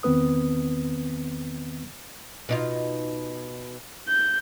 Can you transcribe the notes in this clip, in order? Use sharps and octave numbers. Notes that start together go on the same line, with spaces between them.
E2 D#3 B3 C4 B4 D#6
B2 D#4 F4
G6